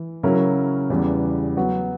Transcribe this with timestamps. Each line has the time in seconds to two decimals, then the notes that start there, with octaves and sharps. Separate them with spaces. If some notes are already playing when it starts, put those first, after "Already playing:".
Already playing: E3
0.23 C#3 F#3 C#4 E4 A#4
0.90 E2 C#3 E3 G3 B3
1.57 F#3 B3 F#4